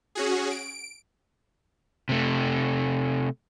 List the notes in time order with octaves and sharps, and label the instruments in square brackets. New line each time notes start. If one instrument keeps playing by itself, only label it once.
[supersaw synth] C#4 F#4 G#4
D7
[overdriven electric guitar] C3 A3